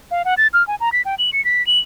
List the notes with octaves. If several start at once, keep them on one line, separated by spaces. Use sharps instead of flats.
F5
F#5
A6
F6
G#5
A#5
B6
G5
F#7
C#7
B6
F#7